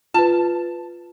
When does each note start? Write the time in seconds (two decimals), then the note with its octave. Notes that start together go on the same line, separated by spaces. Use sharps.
0.14 F4 B4 A5